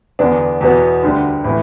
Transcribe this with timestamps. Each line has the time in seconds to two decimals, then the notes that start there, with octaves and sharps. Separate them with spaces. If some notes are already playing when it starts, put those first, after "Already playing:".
0.19 E2 D3 B3 D4
0.61 E2 B2 B3
1.03 D2 D3 G3
1.44 A2 E3